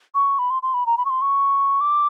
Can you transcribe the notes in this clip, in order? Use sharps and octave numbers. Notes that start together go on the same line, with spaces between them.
C#6
B5
C6
C6
B5
A#5
B5
C#6
C6
C#6
D6